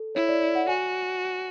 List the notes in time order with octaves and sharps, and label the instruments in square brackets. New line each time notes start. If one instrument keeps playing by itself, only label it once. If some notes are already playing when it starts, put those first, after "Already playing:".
Already playing: [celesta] A4
[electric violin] E4 [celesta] C#5
[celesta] D5
D5
F#5
[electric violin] F#4 [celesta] G#5